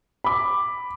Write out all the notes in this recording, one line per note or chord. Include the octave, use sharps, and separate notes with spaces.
B5 D6